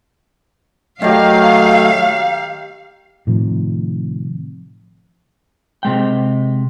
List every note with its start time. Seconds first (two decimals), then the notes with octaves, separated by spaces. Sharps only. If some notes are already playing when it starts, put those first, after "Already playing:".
1.02 D#3 F#3 A3 G4 F5
3.27 A2 C3 D#3 F3
5.83 C3 G#3 G5